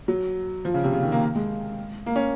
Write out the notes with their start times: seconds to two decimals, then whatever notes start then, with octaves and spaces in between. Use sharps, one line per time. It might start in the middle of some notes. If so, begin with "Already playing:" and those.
0.08 F#3
0.65 F3
0.74 C#3
0.84 C3
0.93 C#3
1.02 D#3
1.12 A#3
1.35 G#3
2.06 A#3
2.16 C#4